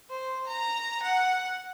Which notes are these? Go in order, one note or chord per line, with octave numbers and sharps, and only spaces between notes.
C5
A#5
F#5